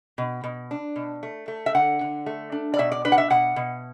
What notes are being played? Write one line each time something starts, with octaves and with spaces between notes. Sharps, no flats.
B2
B2
D4
B2
A3
A3
E5
D3 F#5
D3
A3
D4
D5
B2 E5
D5
D4 B4
F#5
E5
B2 F#5
B2